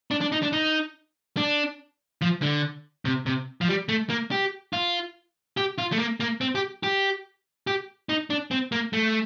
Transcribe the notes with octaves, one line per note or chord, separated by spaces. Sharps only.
D4
D4
D#4
D4
D#4
D4
F3
D3
C3
C3
F3
G3
A3
A#3
G4
F4
G4
F4
A3
A#3
A#3
C4
G4
G4
G4
D#4
D4
C4
A#3
A3